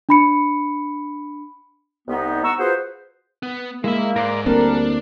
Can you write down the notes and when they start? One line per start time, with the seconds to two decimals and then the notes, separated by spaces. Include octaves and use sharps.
0.09 D4 B5 C#7
2.08 C2 B3 D#4
2.43 F#5 A#5 C#6 E6
2.58 F4 F#4 G#4 B4 C5
3.43 B3
3.84 G#3 A#3 E4 E5 B5
4.16 G#2 A#4 D5 C6
4.46 D2 G3 A#3 C4 D4 A4 A#4